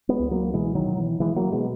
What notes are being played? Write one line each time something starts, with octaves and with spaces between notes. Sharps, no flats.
G#3 B3
C#2
F#3 A#3
B2 E3 G#3
D#3 F#3
B2
E3
B2 E3 G#3
F#3 A#3
B2 G#3 B3